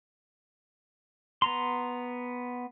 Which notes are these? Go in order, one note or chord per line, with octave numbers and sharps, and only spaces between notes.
B3 A#5 C6